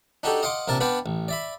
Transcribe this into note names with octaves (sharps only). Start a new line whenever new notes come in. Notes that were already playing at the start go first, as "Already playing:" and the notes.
D4 D#4 F#4 G4 A4
D#5 F5 F#5 C6 D6
A#1 C3 A#4 D5 A5
B3 D4 B4 D5 F5 G5
A1
D5 E5 B5